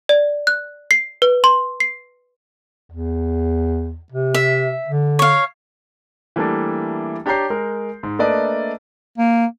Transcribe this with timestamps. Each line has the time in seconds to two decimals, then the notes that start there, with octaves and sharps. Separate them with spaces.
0.09 D5
0.47 F#6
0.91 C7
1.22 B4
1.44 C6
1.80 C7
2.90 E2
4.12 C3
4.34 E5
4.89 D3
5.19 C#5 F5
6.36 E3 G3 A3 A#3 D4
7.26 D4 G4 C#5 A#5 G6 C7
7.50 G#3 A#4
8.03 G#2
8.19 A3 A#3 D4 B4 D5 D#5
9.18 A#3